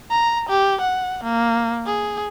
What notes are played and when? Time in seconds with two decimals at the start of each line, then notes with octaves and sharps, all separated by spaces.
0.11 A#5
0.49 G4
0.81 F#5
1.24 A#3
1.86 G#4